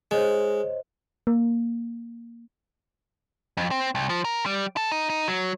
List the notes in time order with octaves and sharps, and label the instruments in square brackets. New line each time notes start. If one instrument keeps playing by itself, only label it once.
[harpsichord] G#3 [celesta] C5 C#5 D#5
[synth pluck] A#3
[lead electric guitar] F2
C4
C2
F3
A#4
G3
A4
D#4
D#4
F#3